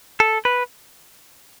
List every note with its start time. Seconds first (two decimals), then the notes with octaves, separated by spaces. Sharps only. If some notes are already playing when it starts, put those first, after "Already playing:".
0.20 A4
0.45 B4